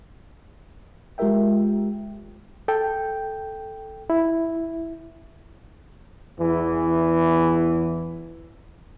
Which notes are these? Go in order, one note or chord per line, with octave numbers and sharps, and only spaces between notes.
G#3 F4 G4 A#4 E5 G5
A4 G5
E4
E2 E3